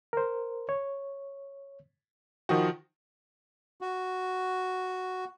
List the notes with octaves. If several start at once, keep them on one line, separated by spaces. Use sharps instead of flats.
A#4 C5
C#5
D#3 F3 F#4 G5 D#6
F#4